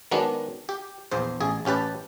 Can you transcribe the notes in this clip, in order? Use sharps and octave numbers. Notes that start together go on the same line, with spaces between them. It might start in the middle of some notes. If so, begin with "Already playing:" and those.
D#3 F#3 G#3 B3 D4
G4
A#1 E2 C5
A1 G#4
A1 C#4 G4 B4 A5